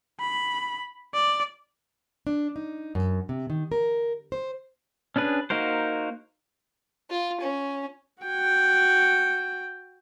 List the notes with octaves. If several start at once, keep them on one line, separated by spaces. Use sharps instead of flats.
B5
D5
D4
D#4
F#2
C3
D#3
A#4
C5
C#4 D4 G#4 B4
A#3 D#4 F#4 A#4 C5
F4
C#4
F#4 G5